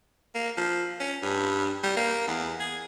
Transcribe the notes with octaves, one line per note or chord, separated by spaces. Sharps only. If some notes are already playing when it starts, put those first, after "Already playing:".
A#3
F3
C#4
G2
G3
A#3
E2
G#4